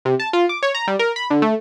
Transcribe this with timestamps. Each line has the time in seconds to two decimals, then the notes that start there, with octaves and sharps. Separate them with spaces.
0.05 C3
0.20 A5
0.33 F4
0.49 D6
0.63 C#5
0.75 A#5
0.87 G3
0.99 A#4
1.16 B5
1.30 D3
1.42 A3